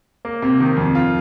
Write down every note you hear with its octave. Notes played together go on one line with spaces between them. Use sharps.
A#3
C3
D#3
F2
F4